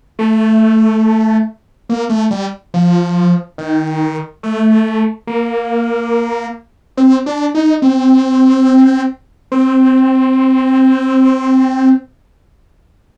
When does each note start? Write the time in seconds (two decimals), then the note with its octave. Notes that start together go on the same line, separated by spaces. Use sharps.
0.19 A3
1.89 A#3
2.10 A3
2.31 G3
2.74 F3
3.58 D#3
4.43 A3
5.27 A#3
6.97 C4
7.26 D4
7.55 D#4
7.82 C4
9.52 C4